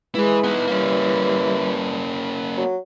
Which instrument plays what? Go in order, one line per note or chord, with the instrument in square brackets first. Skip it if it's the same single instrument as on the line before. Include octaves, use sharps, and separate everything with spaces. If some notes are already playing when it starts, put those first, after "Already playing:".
[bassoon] E3 [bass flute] G#3 [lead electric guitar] E4 B4
[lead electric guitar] B3 D#4
[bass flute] G3 [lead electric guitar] A#3 C#4
[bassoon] F#3